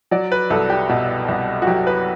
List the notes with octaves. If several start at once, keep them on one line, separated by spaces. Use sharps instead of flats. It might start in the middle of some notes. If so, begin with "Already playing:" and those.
F#3 D5
B4
C2 A4
G4
B2
C2
F#4
F#3 G4
B4